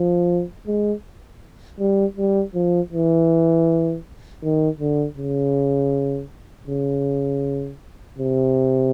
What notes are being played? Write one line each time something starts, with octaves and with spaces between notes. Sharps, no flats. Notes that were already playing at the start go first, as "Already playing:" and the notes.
Already playing: F3
G#3
G3
G3
F3
E3
D#3
D3
C#3
C#3
C3